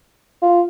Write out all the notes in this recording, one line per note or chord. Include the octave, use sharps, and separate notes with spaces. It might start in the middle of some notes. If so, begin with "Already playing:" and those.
F4